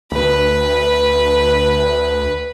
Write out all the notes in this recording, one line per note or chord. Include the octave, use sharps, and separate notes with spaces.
D2 B4